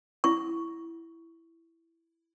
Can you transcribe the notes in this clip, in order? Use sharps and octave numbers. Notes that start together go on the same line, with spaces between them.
E4 C#6